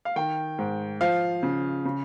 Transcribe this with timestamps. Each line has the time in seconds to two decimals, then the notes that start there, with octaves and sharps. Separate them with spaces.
0.05 F5
0.16 D#3 G5
0.58 G#2
1.01 F3 F5
1.43 C#3
1.85 C#3